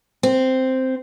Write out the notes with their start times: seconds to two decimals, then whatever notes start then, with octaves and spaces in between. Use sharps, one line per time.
0.23 C4